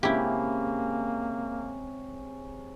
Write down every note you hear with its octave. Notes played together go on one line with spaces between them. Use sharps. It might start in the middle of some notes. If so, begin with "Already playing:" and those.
C3 G#3 A#3 C#4 E4 G4